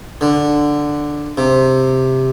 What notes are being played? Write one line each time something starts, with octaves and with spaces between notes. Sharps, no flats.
D3
C3